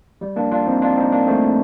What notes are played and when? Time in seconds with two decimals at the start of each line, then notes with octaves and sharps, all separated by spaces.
0.21 G3
0.36 A#3 D4
0.51 D4 F4
0.66 C4 D#4
0.82 D4 F4
0.96 C4 D#4
1.12 A#3 D4
1.27 A3 C4